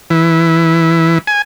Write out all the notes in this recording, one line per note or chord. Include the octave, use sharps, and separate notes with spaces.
E3
G#5